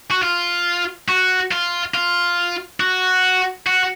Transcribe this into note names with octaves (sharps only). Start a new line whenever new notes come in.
F#4
F4
F#4
F4
F4
F#4
F#4